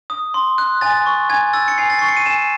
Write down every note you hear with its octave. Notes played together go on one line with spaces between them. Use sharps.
D#6
C6
F#6
G#5 A6
C#6
G#5 G#6
E6 A6
C#7
G#5 C7
A6
C#6 C7
C#7
D#7
G#5 E7